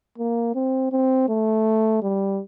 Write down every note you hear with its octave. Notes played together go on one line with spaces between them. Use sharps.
A#3
C4
C4
A3
G3